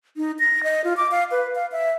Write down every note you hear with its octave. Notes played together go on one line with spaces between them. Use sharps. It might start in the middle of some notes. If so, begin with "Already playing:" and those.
D#4
A#6
D#5
F4
D6
F5
B4
F5
E5